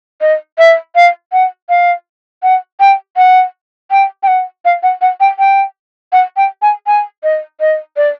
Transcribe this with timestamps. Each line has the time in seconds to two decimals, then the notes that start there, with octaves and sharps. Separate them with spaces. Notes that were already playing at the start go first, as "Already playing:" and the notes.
0.21 D#5
0.58 E5
0.95 F5
1.32 F#5
1.69 F5
2.43 F#5
2.80 G5
3.17 F#5
3.91 G5
4.23 G5
4.27 F#5
4.65 F5
4.83 F#5
5.01 F#5
5.20 G5
5.39 G5
6.12 F#5
6.37 G5
6.62 G#5
6.87 G#5
7.23 D#5
7.60 D#5
7.97 D5